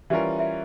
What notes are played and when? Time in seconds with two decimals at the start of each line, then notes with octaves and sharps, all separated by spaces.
0.10 E3 G3 C#4 F4 A#4 E5
0.39 E5